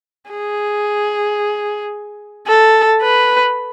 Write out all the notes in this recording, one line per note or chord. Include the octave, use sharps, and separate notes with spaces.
G#4
A4
B4